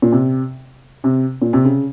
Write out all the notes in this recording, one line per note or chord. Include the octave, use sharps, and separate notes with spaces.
A#2
C3
C3
A#2
C3
C#3